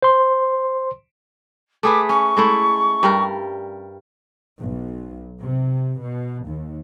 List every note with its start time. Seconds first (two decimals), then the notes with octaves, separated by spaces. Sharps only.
0.03 C5 C6
1.83 A3 G#4 B4 D6
2.09 C#4 C#6
2.37 G#3 A3 E4
3.03 G2 G3 A#4
4.60 B1
5.41 C3
6.00 B2
6.46 D#2